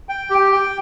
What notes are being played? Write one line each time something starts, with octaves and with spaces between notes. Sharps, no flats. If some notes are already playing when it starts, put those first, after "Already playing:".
G5
G4
G5